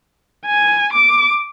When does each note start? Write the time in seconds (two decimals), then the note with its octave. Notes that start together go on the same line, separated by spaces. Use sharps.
0.46 G#5
0.93 D6